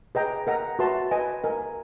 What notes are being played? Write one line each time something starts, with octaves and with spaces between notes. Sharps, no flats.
G#4 B4 D#5 G5 A#5
A#4 D#5 F#5 A#5
F#4 B4 E5 A5 C6
B4 D#5 G#5
A#4 D#5 G#5